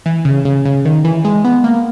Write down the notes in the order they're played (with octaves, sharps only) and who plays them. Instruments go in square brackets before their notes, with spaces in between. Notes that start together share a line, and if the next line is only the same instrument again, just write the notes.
[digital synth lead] E3
C#3
C#3
C#3
D#3
E3
G#3
B3
A#3